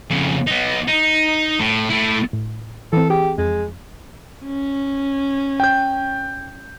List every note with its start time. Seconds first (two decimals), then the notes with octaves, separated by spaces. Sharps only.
0.10 F2 C#3
0.47 B3 D#4
0.88 D#4
1.60 A2
1.90 A3 E4
2.33 A2
2.93 E3 C4 A4
3.10 G4 G#4
3.38 F2 G#3
4.45 C#4
5.60 G5 G6